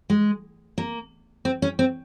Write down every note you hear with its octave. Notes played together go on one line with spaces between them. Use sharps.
G#3
A#3
C4
C#4
C4